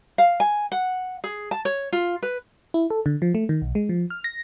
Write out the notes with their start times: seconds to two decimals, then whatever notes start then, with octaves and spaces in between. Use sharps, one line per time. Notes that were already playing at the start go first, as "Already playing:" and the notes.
0.18 F5
0.40 G#5
0.72 F#5
1.24 G#4
1.51 A5
1.65 C#5
1.93 F4
2.23 B4
2.74 E4
2.90 A4
3.06 D3
3.22 F3
3.35 A3
3.49 D#3
3.62 B1
3.75 G#3
3.89 F3
4.10 F6
4.24 A#6